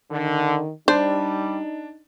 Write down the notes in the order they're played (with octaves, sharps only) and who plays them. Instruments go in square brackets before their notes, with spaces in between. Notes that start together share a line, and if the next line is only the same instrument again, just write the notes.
[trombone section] D3 [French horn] D#3
[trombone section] G3 [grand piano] D4 [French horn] D#4 [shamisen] C5